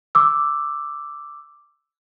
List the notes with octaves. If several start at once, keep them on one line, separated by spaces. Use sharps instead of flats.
D6 E6